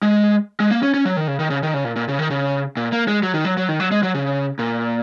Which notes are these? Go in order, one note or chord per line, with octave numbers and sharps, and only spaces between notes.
G#3
G#3
A#3
C#4
C#4
F#3
D#3
C#3
D#3
C#3
D#3
C#3
A#2
A#2
C#3
D#3
C#3
A#2
A#3
G#3
F#3
D#3
F#3
F#3
D#3
F#3
G#3
F#3
C#3
A#2